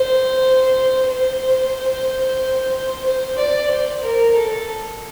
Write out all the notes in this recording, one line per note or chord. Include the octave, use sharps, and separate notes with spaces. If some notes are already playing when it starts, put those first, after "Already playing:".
Already playing: C5
C5
C5
D5
C5
A#4
A4